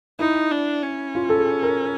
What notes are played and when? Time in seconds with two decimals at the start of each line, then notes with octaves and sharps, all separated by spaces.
0.19 D#4 E4
0.51 D4
0.83 C#4
1.15 F4
1.29 A4
1.38 G#4
1.63 A#4